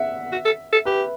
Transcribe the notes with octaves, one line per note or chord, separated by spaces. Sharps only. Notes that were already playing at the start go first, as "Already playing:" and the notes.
Already playing: E5 F#5
F#4
A4
A4
G4 B4